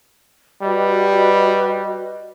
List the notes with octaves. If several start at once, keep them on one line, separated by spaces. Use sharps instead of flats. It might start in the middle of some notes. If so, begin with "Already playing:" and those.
G3 F#4 B4 D#5